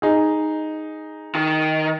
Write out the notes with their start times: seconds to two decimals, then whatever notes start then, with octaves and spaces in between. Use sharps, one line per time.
0.02 D#4 G#4
1.35 D#3